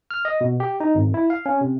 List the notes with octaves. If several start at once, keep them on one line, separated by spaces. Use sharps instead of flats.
F6
D#5
B2
G4
D#4
G#1
E4
F5
C#4
C3